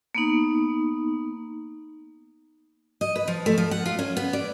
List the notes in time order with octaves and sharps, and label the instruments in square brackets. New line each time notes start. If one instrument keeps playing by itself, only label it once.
[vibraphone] A#3 B3 D#4
[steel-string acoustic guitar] D#5
B4
F3
A3
F3
F#5
F4
C#4
B3
D5